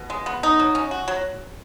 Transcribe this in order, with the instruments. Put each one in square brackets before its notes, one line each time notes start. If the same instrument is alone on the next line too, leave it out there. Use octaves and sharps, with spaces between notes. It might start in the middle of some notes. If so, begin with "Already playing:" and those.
Already playing: [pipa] B2
G#3
B3
D#4
F#3
C#4
F#4
F#3